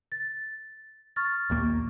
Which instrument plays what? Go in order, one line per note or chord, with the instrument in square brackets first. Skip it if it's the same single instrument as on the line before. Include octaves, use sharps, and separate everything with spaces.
[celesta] A6
C#6 F6 A6
[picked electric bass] A#1 D#2 A#3